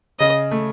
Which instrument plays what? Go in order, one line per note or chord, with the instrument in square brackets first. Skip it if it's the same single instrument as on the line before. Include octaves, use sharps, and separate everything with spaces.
[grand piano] C#3 [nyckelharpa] D#5
[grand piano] A3